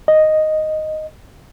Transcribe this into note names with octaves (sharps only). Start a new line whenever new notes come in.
D#5